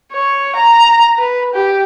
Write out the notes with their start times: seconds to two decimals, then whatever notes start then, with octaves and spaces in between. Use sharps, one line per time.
0.12 C#5
0.56 A#5
1.17 B4
1.54 G4